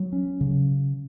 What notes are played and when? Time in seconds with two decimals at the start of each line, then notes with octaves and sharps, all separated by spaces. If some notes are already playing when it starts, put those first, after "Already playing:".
Already playing: F#3
0.13 C#4
0.41 C#3